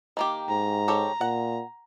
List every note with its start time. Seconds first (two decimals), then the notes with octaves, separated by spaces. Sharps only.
0.17 D#3 A#3 G4
0.49 G#2 A#5
0.88 G4 A4 C#5
1.21 A#2 F#5